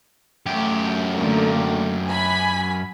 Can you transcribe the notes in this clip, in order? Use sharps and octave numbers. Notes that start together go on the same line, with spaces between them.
F#2 A3 G4
D3 A3 A#3
G#5 B5